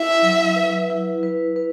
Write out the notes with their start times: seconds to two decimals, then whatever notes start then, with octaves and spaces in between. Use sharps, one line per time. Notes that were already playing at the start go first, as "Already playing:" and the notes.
Already playing: E4 E5
0.22 F#3
0.56 B4
0.90 E4
1.23 B4
1.56 B4